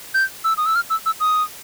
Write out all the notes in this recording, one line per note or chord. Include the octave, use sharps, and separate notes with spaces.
G6
E6
D#6
E6
F6
E6
E6
D#6